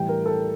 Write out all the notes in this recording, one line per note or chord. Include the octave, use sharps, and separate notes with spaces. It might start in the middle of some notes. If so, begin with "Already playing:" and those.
Already playing: A2 E3 G3 G5
A#4
A4